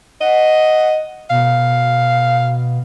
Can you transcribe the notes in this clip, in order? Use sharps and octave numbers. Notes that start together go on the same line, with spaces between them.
D#5 F#5
B2 F5